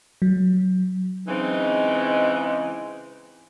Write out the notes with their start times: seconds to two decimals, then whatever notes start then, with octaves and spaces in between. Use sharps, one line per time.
0.22 F#3
1.28 C#3 E3 G#3 C4 D#4